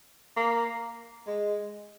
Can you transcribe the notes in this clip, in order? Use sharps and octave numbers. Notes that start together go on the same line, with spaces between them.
A#3
G#3